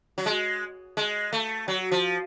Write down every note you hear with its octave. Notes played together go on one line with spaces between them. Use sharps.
F#3
G#3
G#3
A3
F#3
F3